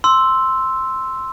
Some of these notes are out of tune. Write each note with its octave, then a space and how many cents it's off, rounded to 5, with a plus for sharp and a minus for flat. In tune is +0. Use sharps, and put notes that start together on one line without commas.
C6 +0 E6 +0